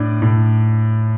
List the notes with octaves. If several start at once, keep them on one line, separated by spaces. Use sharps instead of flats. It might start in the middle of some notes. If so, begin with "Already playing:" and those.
Already playing: A2 D4
A2